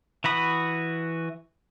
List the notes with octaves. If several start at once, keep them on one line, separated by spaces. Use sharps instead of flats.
E3 F#4 B5 D#6